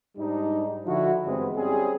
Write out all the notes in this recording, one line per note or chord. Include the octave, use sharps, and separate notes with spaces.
G#2 G3 D4 D#4
D3 F3 E4 F#4
G2 E3 G#3 B3 C4
G3 C4 C#4 G#4